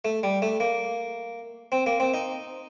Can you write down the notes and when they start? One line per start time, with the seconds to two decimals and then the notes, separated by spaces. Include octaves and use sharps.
0.05 A3
0.23 G3
0.42 A3
0.60 A#3
1.72 C4
1.86 A#3
2.00 C4
2.14 D#4